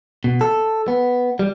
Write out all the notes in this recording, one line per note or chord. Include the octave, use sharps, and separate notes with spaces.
B2
A4
B3
G3